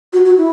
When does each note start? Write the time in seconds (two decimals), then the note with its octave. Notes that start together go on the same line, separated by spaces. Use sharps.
0.13 F#4
0.25 F#4
0.37 E4